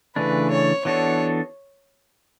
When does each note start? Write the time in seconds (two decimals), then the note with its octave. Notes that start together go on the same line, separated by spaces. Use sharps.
0.16 C#3 E3 A3 D4 B4
0.50 C#5
0.85 E3 B3 D4 F#4 A4 C#5